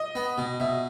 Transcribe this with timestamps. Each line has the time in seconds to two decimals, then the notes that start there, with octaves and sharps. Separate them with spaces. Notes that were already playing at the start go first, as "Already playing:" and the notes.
Already playing: D#5
0.15 B3
0.38 B2
0.60 B2 E5